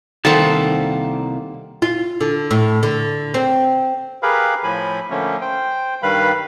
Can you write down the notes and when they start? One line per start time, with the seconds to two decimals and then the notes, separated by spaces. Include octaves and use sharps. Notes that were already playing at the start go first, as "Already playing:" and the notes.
0.25 C2 D#3 A#3 A4 C5 F#5 A5
1.82 F4
2.21 D3
2.51 A2
2.83 D3
3.34 C4
4.23 G4 G#4 A#4 B4 F5 B5
4.63 A2 F3 G#5 B5
5.10 D3 F3 A3 A#3 C#4
5.41 C5 G5
6.03 G2 D#3 G3 B4 F5 B5